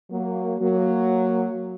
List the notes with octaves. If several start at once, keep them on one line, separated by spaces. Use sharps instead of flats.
F#3 A#3
F#3 A#3